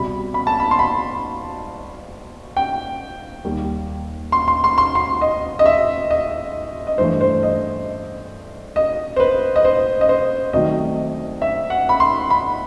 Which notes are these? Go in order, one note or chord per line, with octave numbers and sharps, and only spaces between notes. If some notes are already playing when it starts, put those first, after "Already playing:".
Already playing: C2 B2 G3 B5
B5
A5
B5
C6
B5
G5
D#2 D#3 G3
C6
C6
C6
C6
C6
D#5
D#5
E5
D#5
D#5
G2 E3 A3 C5
C5
D#5
D#5
C5
B4
D#5
C5
D#5
C5
C2 C3 D#3 F#3 A3 D#5
E5
F#5
B5
C6
B5